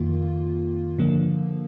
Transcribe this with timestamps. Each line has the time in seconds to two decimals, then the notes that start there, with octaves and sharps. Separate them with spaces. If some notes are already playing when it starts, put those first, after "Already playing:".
Already playing: F2 D#3 A#3 F4
0.98 G2 D3 F3 A#3